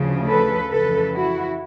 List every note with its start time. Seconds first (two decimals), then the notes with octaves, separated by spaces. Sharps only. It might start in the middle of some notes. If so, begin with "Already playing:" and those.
Already playing: D2 C#3 F3
0.27 A4 B4
0.70 F2 C#3 E3 A4 B4
1.14 E4 F#4